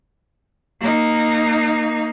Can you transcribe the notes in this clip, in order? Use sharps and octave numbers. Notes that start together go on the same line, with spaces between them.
A#3 D#4